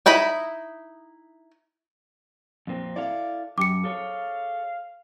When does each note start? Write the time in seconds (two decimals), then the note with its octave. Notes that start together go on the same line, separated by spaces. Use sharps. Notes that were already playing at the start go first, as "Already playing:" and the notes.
0.06 D#4 E4 D#5 B5
2.67 F2 A#2 C4
2.96 E4 A4 D5 F5
3.58 F#2 G4 D6 C#7
3.84 G#4 A4 C#5 F5